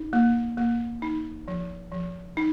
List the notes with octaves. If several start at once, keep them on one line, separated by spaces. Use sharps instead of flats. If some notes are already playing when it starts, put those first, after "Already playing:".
Already playing: D#4
A#3
A#3
D#4
F3
F3
D#4